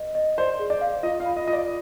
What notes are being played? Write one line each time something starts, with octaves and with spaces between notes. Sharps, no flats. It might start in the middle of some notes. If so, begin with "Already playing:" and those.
Already playing: B4 D#5
D#5
C5 D5
G#4
D5
F5
F4 D#5
F5
B5
D#5
F4 D#5
D5